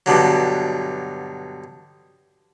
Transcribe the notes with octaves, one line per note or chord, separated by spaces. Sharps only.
G2 B2 D3 F#3